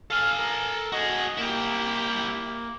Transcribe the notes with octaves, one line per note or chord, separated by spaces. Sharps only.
A4 F5 G#5
A#4
F#4 G#4 D#5
A#3 E4 G4